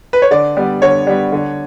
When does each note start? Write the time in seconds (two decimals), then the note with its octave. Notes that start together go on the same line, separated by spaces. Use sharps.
0.13 B4
0.22 C#5
0.31 D3 D5
0.57 G3 B3
0.82 D3 C#5
1.07 G3 B3
1.32 D3